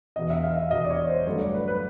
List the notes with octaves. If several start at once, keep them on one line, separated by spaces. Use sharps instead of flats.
E1 E2 B2 D#5
E5
F5
E5
E1 E2 B2 D#5
D5
C#5
C5
G2 D3 F#3 A3 C#5
D5
B4
B4